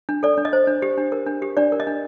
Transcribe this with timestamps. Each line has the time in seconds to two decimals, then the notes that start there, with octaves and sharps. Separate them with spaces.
0.09 D4
0.23 A4 D5
0.37 D4
0.45 D#5
0.53 C5
0.67 D4
0.82 G4
0.98 D4
1.12 A#4
1.27 D4
1.42 G4
1.57 D4 D5
1.72 A#4
1.80 D#5
1.87 D4